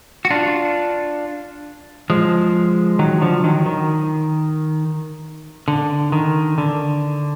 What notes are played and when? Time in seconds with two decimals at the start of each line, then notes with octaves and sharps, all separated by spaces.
0.25 F#4
0.30 D4 F4
2.10 F3 G#3
2.99 D#3 F#3
3.21 D3 F3
3.44 D#3 F#3
3.66 D#3
5.68 D3
6.12 D#3
6.58 D3